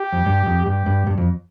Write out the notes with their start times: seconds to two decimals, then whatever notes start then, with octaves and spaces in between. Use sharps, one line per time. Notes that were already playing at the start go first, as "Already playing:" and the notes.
Already playing: G4
0.13 F2
0.26 G2
0.46 F2
0.66 G2 G4
0.86 G2
1.07 G2
1.18 F2